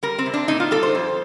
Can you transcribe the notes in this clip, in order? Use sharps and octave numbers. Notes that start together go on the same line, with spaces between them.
G3 A#4
C4
C3
D4
A#2 D#4
F4
G3 A4
C5
F2